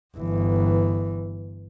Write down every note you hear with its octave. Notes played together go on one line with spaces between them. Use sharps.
G1 E3